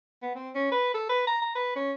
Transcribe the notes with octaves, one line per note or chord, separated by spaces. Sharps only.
B3
C4
C#4
B4
A4
B4
A#5
A#5
B4
C#4